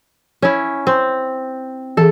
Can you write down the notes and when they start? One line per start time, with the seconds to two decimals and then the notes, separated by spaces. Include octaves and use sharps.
0.42 C#4 E4
0.87 C4
1.97 E3 G#4 A4